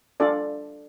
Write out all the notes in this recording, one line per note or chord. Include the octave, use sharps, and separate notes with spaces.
D4 F4 A4 D5